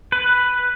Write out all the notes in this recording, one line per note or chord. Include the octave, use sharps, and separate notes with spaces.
B4